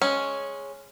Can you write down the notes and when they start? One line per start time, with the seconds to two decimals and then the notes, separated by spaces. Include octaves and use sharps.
0.02 G#3 C#4